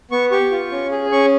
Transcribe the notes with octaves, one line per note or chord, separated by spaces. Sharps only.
B3 C#6
G4 C#6
F4
C#4
G#4
C#4 C#6